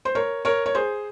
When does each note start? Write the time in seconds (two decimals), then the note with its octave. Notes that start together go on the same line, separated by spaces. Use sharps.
0.05 C5
0.15 A#4 C#5
0.45 A#4 C#5
0.66 C#5
0.75 G#4 C5